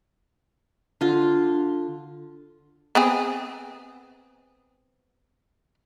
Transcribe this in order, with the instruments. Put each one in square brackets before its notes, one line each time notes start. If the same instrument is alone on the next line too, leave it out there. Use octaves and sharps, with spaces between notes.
[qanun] D3 F4 [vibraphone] D4
[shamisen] B3 C4 G#4